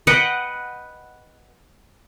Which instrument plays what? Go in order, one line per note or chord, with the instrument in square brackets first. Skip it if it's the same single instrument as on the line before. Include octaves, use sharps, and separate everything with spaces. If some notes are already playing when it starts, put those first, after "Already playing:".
[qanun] B4 D#5 F#5 G5